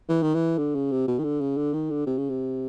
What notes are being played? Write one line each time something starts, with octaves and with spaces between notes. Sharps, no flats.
E3
D#3
E3
D3
C#3
C3
B2
D#3
D3
C#3
D3
D#3
D3
C3
C#3
C3